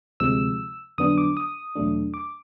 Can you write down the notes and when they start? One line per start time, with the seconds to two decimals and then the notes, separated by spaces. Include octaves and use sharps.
0.20 D2 C3 F3 G#3 E6
0.98 F2 D3 F#3 B3 D4 D#6
1.18 D6
1.37 D#6
1.75 E2 B2 F#3 A3 D4
2.14 D6